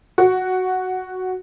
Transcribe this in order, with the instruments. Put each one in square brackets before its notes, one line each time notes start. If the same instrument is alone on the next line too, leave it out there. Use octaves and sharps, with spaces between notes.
[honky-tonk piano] F#4